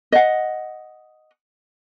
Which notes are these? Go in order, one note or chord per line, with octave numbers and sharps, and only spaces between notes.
D#5 F#5